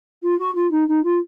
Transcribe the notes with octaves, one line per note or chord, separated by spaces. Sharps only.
F4
F#4
F4
D#4
D#4
F4